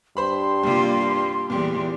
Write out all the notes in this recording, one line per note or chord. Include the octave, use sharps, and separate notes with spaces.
G2 C5 B5 C6
C3 G3 A#3 F4 G4
E2 A#2 G3 G4